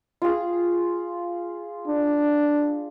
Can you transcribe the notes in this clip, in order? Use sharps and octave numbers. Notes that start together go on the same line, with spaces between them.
F4 G#4
D4